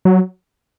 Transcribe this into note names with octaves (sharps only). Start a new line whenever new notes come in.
F#3